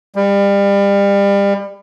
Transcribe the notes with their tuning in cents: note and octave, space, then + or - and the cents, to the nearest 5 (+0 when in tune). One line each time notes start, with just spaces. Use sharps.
G3 +30